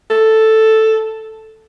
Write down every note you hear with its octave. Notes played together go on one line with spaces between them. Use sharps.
A4